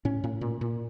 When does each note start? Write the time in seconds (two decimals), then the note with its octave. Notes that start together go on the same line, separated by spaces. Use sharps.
0.05 A2 C#4
0.24 A2
0.41 A#2
0.61 A#2